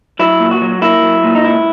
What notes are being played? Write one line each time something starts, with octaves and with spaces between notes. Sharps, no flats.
F#3 E4
A#2
F#4
F#3
A#3 E4
F#3
A#2
D#4
C#2 E4